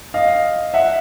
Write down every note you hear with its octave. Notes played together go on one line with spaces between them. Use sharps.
D#5 F5
E5 F#5